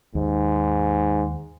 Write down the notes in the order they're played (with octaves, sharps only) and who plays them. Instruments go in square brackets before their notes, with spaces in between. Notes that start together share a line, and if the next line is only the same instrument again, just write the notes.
[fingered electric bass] D#2 [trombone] G#2